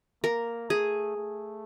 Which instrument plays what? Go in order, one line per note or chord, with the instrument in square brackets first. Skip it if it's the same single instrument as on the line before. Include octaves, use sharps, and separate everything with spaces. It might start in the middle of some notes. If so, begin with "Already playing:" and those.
[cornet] A#3 [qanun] A#4
[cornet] A3 [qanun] G#4
[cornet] A3